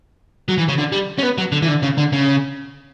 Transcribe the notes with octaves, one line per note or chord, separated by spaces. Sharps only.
F#3
E3
C#3
D3
G3
C#4
B3
F#3
D3
E3
D3
C#3
D3
C#3